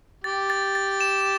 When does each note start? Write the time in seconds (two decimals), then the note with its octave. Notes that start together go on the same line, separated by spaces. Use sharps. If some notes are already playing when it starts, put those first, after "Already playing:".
0.24 G4 A6
0.50 A6
0.75 A6
1.01 E7